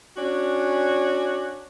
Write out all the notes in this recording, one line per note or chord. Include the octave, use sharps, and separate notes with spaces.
C#4 D4 F#4